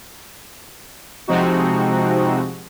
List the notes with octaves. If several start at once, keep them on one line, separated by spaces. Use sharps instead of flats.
C3 F3 G#3 C4 D#4 F#4